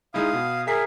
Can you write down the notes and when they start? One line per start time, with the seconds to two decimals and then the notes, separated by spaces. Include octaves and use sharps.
0.14 G#3 D#4 E4 F5 D#6
0.33 B2
0.67 G#4 A#4 E5 B6 C7